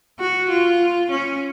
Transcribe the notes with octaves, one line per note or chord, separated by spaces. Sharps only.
F#4
F4
C#4